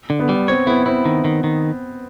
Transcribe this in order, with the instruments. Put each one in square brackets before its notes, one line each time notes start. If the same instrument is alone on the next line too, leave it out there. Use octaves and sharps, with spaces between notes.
[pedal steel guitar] D3
[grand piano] B3
[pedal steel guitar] G3
[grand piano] C4 [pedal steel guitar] C#5
[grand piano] B3 [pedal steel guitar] E4
[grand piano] C4 [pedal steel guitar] E4
[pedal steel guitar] D#3
D#3
D#3